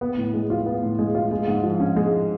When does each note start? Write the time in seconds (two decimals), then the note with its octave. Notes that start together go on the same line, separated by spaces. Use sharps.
0.01 B3
0.17 A2
0.33 G#3
0.50 F4
0.66 B3
0.82 A2
0.99 G#3
1.15 F4
1.31 G#3
1.48 G#2
1.63 F3
1.80 C#4
1.96 G#3